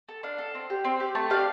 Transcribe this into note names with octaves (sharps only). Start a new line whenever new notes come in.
A4
D4 F5
A4
C4
G4
C4
G4
A3 A5
D4 G4 F5